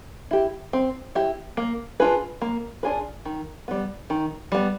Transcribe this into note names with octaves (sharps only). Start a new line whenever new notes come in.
E4 G4
C4
E4 G4
A#3
D4 F4 G#4 B4
A#3
D4 F4 G#4 B4
D#3
G3 B3
D#3
G3 B3